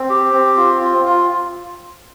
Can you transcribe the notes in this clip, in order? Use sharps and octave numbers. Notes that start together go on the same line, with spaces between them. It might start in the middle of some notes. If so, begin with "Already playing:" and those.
Already playing: C4
G4
C4
F4
F4
F4